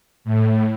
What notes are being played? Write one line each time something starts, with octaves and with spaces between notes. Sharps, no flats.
A2